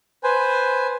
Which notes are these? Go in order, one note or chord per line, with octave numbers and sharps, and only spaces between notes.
B4 C5 G#5